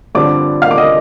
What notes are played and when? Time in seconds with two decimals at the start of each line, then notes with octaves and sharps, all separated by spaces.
0.15 G2 D3 F3 C4 D5 D6
0.62 F5 F6
0.71 D6
0.78 D#5 D#6